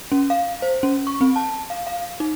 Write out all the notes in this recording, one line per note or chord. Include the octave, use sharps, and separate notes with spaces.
C#4
F5
C5
C#4
C#6
C4
A5
F5
F5
D#4